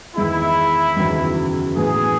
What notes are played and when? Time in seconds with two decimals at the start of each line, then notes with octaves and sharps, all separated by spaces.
0.14 E2 D#3 G#3 D#4 E4 G#4
0.96 F#1 E2 D#3 F#3 C#4
1.76 A2 E3 B3 G#4